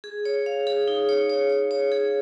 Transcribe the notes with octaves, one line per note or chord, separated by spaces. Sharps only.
G#4
C#5
F5
G#4
D#4
C#5
C#5
C#5
C#5
G#4